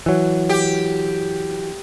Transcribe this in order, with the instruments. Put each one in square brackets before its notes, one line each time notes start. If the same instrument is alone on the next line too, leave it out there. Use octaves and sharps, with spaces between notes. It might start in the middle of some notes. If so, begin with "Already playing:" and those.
[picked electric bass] E3 F#3
[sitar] G4